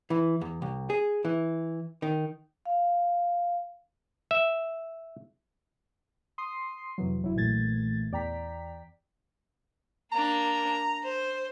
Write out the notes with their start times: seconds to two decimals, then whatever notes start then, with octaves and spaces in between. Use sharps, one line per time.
0.10 E3
0.41 E2
0.62 C2
0.90 G#4
1.25 E3
2.02 D#3
2.66 F5
4.31 E5
6.38 C6 D#6 C7
6.98 F2 C3 E3 F#3
7.22 G1 F#3 E4
7.35 B1 A#2 E3 A3 G#6 A6
8.12 E2 D5 G5 A#5 B6
10.12 A#3 D4 A#5
11.03 C5